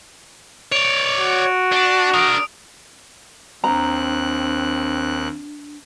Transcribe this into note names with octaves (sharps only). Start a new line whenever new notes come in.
C#5 D5 D7 F7
F#4
D4
D4 A#4 D#6 D7
D#2 C4 D4 A#5 F#6